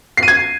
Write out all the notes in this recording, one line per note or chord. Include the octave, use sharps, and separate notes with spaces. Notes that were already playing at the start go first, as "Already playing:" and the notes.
C7
D#7
G#6